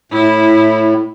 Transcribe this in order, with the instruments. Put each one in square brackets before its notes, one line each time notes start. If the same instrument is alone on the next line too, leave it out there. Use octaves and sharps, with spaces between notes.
[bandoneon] A2 [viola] E4